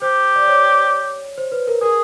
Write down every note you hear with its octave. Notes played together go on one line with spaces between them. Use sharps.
G4 C5
D5
C#5
C5
B4
A#4
G#4 A#4